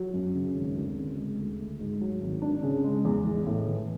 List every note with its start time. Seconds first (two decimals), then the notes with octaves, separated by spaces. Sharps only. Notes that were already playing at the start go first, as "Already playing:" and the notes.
Already playing: F#3
0.14 F#2
0.35 C#3
0.55 G#1
0.75 D2
0.97 C#3
1.17 G#3
1.39 D2
1.59 A3
1.80 G#2
2.01 F#3
2.22 G#1
2.42 D4
2.63 C#3
2.84 G#3
3.05 E2
3.25 A1
3.46 A2
3.68 E3